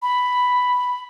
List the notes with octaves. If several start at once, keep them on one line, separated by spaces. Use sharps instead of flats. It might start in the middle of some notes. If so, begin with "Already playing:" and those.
B5